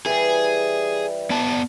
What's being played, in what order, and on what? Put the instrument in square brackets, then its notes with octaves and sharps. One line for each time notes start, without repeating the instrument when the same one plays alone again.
[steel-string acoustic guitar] E3 G3 [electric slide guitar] G#4
[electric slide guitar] B3 D5 A5